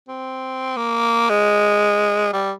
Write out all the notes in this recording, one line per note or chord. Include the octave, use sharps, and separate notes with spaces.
C4
A#3
G#3
G3